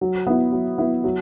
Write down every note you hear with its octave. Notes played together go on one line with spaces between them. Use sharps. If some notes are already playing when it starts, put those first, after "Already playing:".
F#3
B3 E4
F#3
B3 E4
F#3